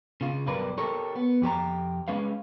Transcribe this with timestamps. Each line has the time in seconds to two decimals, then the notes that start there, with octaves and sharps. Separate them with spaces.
0.21 C#3 F4
0.46 B1 F#2 G3 A#4 B4 D5
0.78 G4 A4 A#4 C#5
1.16 B3
1.42 F2 G4 C5 A#5
2.08 G#3 C#4 B4 F5